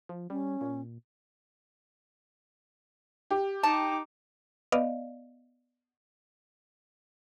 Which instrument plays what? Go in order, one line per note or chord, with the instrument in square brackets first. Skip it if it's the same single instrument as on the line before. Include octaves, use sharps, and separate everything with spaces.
[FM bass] F3
[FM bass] G3 [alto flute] C#4
[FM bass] A#2
[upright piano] G4
[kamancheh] D#4 D6 [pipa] A5
[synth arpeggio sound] B3 D5 D#5 F5